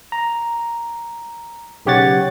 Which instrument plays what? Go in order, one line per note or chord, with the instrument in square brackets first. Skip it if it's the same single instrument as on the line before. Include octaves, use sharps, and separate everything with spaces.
[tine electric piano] A#5
B1 C#3 G4 C#5 F#5 A6